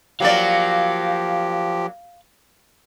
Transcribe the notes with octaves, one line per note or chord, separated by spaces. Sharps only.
F3 F#3 A#3 G4 D5 F5